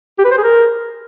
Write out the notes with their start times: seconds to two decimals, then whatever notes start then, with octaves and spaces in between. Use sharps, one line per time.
0.19 G4
0.25 B4
0.31 C5
0.38 G#4
0.44 A#4